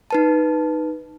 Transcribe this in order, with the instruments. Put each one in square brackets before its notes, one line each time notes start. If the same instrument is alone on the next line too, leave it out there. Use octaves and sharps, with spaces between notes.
[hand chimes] D#4 B4 A5